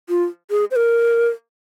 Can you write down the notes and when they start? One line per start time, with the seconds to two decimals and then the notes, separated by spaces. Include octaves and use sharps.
0.09 F4
0.51 G#4
0.71 C5
0.76 A#4